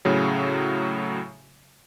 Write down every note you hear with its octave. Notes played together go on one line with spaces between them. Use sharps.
A2 C#3 F#3